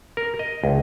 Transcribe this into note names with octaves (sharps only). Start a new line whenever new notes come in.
A#4
D#5
C#2